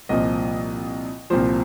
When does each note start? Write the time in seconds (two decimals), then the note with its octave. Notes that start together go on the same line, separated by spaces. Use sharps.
0.09 C2 A#2 F3 D#5
1.30 C2 A#2 F3 C5